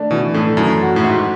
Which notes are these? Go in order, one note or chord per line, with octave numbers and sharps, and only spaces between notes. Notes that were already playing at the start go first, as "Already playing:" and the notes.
Already playing: A3 D4
B2 E3
A2 A3
F#2 E3
F#4
A2
G#2 F#4